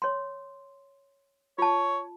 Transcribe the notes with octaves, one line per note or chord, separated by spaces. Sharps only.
C#5 C6
F4 C#5 A5